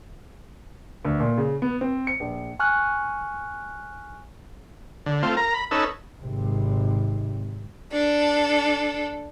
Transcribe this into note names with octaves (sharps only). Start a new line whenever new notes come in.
D2
A#2
C#3
B3
C4
C#7
A#1
G#5 C#6 F6 F#6
D3
A3 C4 F4
A#4 A#5
B5
C#4 D#4 A4 B4 E6
G#1 C3
D4 A4